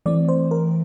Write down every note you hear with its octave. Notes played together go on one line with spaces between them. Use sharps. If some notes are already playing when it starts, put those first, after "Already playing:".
E3 A3 C4 D5
C5
A#4